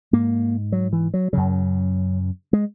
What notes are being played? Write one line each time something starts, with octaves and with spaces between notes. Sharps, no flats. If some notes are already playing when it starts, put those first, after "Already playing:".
G#2 A#3
F#3
E3
F#3
F#2 C#3 F#3
G#3